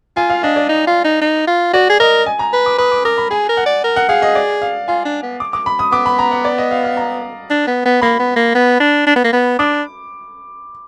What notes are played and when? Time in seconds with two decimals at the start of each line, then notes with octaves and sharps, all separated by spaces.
0.17 F4 G#5
0.30 F5
0.43 D4 D#5
0.56 D5
0.69 D#4
0.87 F4
1.04 D#4
1.21 D#4
1.47 F4
1.73 F#4 D5
1.90 G#4
2.00 A#4 D#5
2.26 G#5
2.39 A#5
2.53 B4
2.66 D6
2.78 B4 D#6
2.92 D6
3.05 A#4 D6
3.18 B5
3.30 G#4 G#5
3.49 A#4
3.57 F#5
3.66 D5
3.84 A#4
3.96 F#5
4.09 G#4 F5
4.22 D#5
4.35 D5
4.62 F5
4.88 F4 G#5
5.05 D4
5.22 B3
5.40 D6
5.53 D6
5.66 B5
5.79 D#6
5.92 B3 D6
6.06 B5
6.19 A#5
6.32 F#5
6.45 D5
6.58 D#5
6.71 F5
6.84 F5
6.97 A#5
7.50 D4
7.67 B3
7.85 B3
8.02 A#3 B5
8.19 B3
8.36 A#3
8.55 B3
8.80 D4
9.07 D4
9.16 B3
9.24 A#3
9.33 B3
9.59 D4 D6